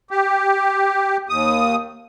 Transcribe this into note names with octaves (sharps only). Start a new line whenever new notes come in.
G4
D#2 D#6